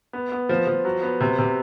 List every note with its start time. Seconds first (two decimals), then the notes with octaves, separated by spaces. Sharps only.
0.13 B3
0.32 B3
0.49 F3
0.67 F3
0.85 F#3
1.03 B3
1.20 C3
1.39 C3